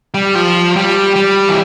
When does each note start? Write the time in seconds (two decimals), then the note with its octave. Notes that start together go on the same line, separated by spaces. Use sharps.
0.14 G3
0.35 F3
0.76 G3
1.16 G3
1.49 E3